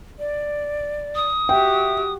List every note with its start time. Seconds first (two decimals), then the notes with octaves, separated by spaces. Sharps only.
0.19 D5
1.15 D#6
1.49 F#4 G4 E5 G5